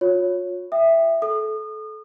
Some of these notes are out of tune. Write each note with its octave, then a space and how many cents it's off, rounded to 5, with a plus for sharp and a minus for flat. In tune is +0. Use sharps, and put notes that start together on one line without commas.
F4 +40 C#5 +0
E5 +0 G5 +0 D#6 -35
A4 -25 D#6 -35